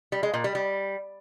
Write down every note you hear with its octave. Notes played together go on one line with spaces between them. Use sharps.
G3
G#3
A#2
G3
G3